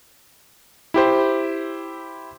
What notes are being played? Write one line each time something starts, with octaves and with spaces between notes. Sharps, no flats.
E4 G4 C5